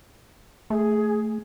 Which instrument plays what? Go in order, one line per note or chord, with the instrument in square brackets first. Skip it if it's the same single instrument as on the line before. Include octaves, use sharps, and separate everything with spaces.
[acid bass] A3 [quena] G#4